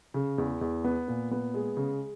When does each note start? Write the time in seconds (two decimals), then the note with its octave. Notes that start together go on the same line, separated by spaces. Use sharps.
0.14 C#3
0.38 E2
0.61 E2
0.84 B3
1.08 A#2
1.31 B3
1.54 G#3
1.77 C#3